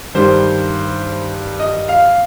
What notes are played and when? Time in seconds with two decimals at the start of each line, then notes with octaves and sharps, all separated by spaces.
0.15 G2 D#3 G3 C5
1.60 D#5
1.89 F5